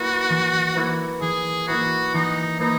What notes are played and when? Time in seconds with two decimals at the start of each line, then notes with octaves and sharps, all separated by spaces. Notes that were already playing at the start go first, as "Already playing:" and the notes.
Already playing: A#3 E4 F#4 B4
0.29 E3
0.75 A#3 E4 B4
1.21 E3 G#4
1.68 A#3 E4 F#4 B4
2.14 E3 D#4
2.60 A#3 D#4 E4 B4